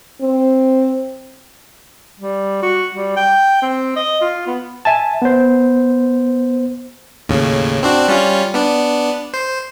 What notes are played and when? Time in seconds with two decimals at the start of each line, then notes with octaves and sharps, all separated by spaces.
0.21 C4
2.20 G3
2.63 F#4
2.95 G3
3.17 G5
3.62 C4
3.96 D#5
4.22 F4
4.47 B3
4.85 E5 G#5 A5
5.22 B3 C5
7.29 D#2 A2 C#3
7.83 C4 D4 F#4
8.08 G3 C#4 F4
8.54 B3 D4
9.34 C5